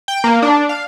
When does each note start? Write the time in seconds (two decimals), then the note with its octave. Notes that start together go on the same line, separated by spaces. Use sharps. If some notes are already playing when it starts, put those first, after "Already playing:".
0.08 G5
0.24 A#3
0.42 D4
0.69 F5